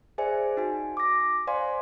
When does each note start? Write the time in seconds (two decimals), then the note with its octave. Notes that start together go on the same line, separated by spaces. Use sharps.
0.18 G#4 C5 D5 E5 G#5
0.57 D#4 F#4 G#5
0.97 D6 A#6
1.47 C5 D5 F5 G#5 C6